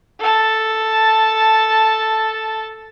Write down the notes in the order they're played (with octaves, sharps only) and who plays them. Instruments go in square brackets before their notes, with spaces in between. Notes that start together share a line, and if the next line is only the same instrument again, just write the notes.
[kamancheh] A4 A5